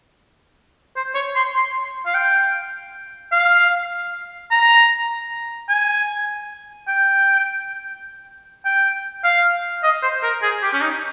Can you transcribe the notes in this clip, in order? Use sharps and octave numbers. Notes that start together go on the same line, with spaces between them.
C5
C#5
C6
C6
F5
G5
F5
A#5
G#5
G5
G5
F5
D#5
C5
A#4
G#4
G4
C#4
D#4